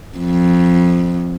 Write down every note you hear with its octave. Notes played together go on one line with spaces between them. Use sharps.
F2